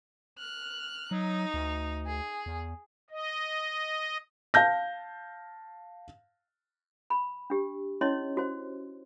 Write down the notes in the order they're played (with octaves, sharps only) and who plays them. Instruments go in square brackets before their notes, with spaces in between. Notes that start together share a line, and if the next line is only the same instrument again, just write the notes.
[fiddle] F6 F#6
[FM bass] F#3 [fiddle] D#4
[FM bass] D2
[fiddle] G#4
[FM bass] E2
[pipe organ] D#5
[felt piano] F5 A5 G6 A#6
[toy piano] B5
D4 G4
C#4 E4 C#5 D#5 C6
F#4 C5